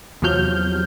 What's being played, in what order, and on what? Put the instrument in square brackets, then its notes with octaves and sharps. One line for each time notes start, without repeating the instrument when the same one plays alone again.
[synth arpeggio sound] E2 C3 F3 F#3 F6 G6